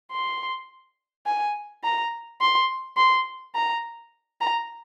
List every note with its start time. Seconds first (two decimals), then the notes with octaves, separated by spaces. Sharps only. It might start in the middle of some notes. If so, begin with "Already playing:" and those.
0.12 C6
1.26 G#5
1.84 A#5
2.41 C6
2.97 C6
3.55 A#5
4.41 A#5